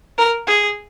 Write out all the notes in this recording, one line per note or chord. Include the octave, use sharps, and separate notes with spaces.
A#4
G#4